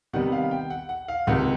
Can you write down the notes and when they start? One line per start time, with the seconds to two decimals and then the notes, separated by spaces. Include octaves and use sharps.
0.13 C3 D#3 G3 B3 F#5
0.32 F5
0.51 G5
0.70 F#5
0.89 F#5
1.08 F5
1.27 C#2 C3 D#3 F#5